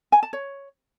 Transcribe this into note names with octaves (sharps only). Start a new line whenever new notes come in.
G#5
A5
C#5